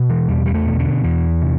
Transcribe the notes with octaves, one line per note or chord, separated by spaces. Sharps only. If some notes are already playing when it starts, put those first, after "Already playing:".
Already playing: B2
E3
E2 G3
G3
A3
B2
D3
E2 E3
C3